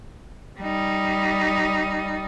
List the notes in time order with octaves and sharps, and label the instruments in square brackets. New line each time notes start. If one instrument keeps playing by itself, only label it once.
[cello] G3 D#4